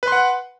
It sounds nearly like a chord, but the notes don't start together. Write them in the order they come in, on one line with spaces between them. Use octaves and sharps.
B4 C6 F#5